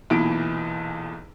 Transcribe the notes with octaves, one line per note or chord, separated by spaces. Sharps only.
B1 E2 A#2 E3 E4 D7